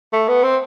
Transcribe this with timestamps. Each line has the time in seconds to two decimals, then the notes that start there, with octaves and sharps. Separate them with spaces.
0.13 A3
0.28 B3
0.43 C4